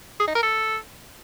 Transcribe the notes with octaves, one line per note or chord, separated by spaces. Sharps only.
G#4
D#4
A#4
A4